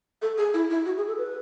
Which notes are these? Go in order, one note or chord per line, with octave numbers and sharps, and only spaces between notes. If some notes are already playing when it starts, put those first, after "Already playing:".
A4
G#4
E4
E4
F#4
G#4
A4
B4